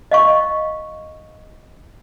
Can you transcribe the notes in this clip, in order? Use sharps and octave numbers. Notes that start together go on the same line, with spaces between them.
D#5 F5 C#6